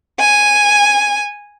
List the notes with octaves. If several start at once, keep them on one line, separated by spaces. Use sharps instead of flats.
G#5